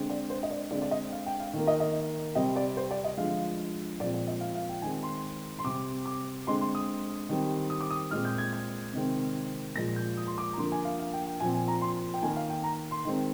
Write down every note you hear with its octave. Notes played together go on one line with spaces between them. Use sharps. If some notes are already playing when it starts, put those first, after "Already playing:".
Already playing: D3 G#3 C4
D5
C5
D#5
D5
D3 G#3 C4 D5
D5
D#5
F5
G5
F5
D#3 A#3
D#5
D#5
C3 G3 C4 D#5
D5
C5
D5
D#5
D3 F3 G#3 F5
A#2 F3 G#3 C4 D5
D5
D#5
F5
F5
G5
D#3 G#3 C4 G#5
C6
C6
C3 G3 C4 D6
D6
D3 G#3 C4 C6
C6
D#6
D#3 G3 C4
D#6
D6
D#6
A#2 G#3 C4 F6
G6
G#6
G#6
C3 D#3 G#3 C4
A#2 F3 G#3 A#6
G6
D#6
C6
D6
A#5
D3 F3 A#3 C6
G#5
F5
F5
G5
G5
A#2 F3 C4 G#5
G#5
A#5
C6
G5
D#3 A#3 G#5
F5
G5
A#5
C6
D#3 G#3 C4